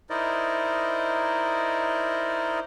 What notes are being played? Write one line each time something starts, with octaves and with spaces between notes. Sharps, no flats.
D#4 E4 A#4 C5 D5 D#5